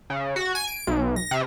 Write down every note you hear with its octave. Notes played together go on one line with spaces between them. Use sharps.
C#3
F#4
G#5
D7
B1
A#6
C3